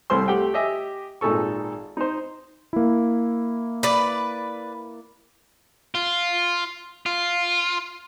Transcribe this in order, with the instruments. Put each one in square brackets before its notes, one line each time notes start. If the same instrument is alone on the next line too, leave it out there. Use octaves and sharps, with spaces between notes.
[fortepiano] C2 A4 C5 C6
A3 G4 F#5 G5
G4 D#5 E5 G#5
G#1 A#2 D#4 G#4 A4 C#6
D#4 C5
[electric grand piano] A#3 E4
[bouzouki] B4 D5
[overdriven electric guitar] F4
F4